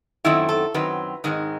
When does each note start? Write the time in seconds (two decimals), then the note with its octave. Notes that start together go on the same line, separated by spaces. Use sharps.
0.24 F#2 D#3 F#3 A3 C4 E4
0.49 A4
0.74 F#2 D#3 F#3 C4 B4
1.24 G#2 D#3 G#3 C4